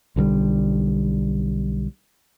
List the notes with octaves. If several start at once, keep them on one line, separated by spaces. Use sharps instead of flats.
B1 D3 F#3 G3